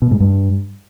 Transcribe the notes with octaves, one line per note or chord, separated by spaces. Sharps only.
B2
G#2
G2